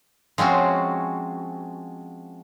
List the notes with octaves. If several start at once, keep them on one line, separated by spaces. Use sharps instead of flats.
F3 G#3 C4 C#4 F#4